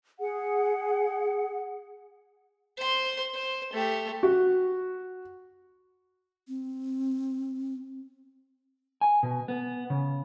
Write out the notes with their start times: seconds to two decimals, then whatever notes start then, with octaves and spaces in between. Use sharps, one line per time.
0.19 G#4 F#5
2.77 C5 C6
3.34 C5
3.73 A3 G4
4.23 F#4
6.48 C4
9.01 G#5
9.23 B2
9.48 B3
9.90 C#3